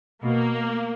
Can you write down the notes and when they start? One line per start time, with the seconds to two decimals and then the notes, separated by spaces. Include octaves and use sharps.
0.24 B2 A#3